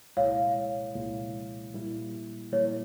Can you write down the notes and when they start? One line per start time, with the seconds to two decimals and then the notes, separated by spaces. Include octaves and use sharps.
0.17 C2 A#2 G#3 E4 C#5 F5
0.95 C2 A#2 G#3 E4
1.74 A#2 G3 A#3 E4
2.52 A#2 G3 A#3 E4 C#5